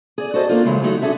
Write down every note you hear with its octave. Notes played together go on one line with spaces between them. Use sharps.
G#4 D5
F#4 A4 C5 D#5
A#3 D4 F4
C#3 E3 F#3 G#3
F#3 G#3 A3 D#4 F#4
D4 F#4 G#4 A4 E5